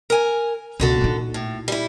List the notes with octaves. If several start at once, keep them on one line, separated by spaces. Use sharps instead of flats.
A#4 G#5
C#2 B2 D3 F#4 A4
A#2 D#4
A2
G3 E4